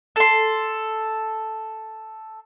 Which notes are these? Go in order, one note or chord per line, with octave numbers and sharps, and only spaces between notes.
A4 C6